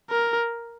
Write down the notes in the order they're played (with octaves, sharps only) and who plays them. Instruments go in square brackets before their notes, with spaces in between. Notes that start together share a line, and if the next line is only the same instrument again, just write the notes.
[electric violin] A#4